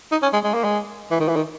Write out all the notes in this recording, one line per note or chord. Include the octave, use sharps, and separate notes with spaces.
D#4
C#4
G#3
G#3
A#3
G#3
E3
D#3
E3
D#3